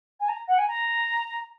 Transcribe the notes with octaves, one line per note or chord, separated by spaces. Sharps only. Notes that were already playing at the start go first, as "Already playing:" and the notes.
G#5
A#5
F#5
G#5
A#5